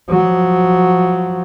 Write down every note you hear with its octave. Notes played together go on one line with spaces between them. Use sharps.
F3 F#3